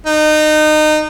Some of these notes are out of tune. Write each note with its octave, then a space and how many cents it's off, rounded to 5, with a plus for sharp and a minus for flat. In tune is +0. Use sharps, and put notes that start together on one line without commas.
D#4 -25